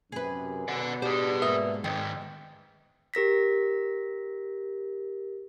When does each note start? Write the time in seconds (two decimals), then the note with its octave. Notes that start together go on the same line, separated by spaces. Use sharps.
0.12 F#2 C3 G#4 B4
0.68 B2 B3 D5 F#5
1.02 D4 G4 G#4 C5
1.42 G#2 A#3 B4 E5 D#6
1.84 G#2 D#3 G#3 G5
3.14 G4 A#4 A#6 B6